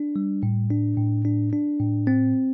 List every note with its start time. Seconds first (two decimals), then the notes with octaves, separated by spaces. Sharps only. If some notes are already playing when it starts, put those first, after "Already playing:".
Already playing: D4
0.16 G3
0.43 A2
0.70 D4
0.97 A2
1.25 D4
1.53 D4
1.80 A2
2.07 C4